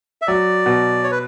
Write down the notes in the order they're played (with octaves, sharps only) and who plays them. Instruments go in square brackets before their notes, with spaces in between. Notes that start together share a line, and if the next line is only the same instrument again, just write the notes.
[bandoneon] E5
[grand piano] F#3 [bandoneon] D5
[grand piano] B2
[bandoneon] C#5
B4